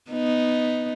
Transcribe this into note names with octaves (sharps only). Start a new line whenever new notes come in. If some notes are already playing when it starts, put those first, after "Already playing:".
B3 D#4